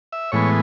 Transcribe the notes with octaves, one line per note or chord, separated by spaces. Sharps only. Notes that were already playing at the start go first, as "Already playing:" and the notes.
E5
A2 E3 G#3 B3 C#5